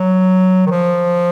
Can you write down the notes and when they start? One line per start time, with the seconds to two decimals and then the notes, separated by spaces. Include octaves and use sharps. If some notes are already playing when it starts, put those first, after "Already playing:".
Already playing: F#3
0.67 D#3
0.71 F3